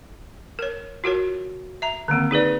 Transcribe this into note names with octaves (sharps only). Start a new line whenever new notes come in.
A#4 C#5
F4 F#4 A#4 C#5
E5 A#5
D3 D#3 A#3 C4
D#4 G#4 B4 D5